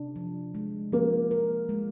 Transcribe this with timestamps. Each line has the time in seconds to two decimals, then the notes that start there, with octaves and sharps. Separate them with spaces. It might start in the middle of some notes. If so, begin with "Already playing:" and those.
Already playing: C3 D4
0.16 F3
0.55 G#3
0.92 F3 A#3
1.31 A#4
1.69 G#3